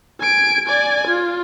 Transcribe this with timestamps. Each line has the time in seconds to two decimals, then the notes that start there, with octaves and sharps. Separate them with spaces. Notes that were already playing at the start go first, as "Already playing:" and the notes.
0.20 G#5 D7
0.67 D5 G#5
1.07 F4